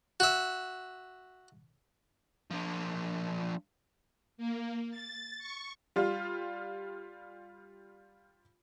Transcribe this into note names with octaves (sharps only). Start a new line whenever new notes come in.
F#4 E5
F3 D4
A#3
A6
C#6
G3 F4